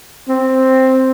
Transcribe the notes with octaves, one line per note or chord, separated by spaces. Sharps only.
C4